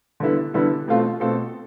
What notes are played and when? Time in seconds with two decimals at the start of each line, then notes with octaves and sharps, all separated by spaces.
0.20 D3 G3 B3 E4 A4
0.54 D3 G3 B3 E4 A4
0.88 B2 A3 C4 F4 A4
1.20 B2 A3 C4 F4 A4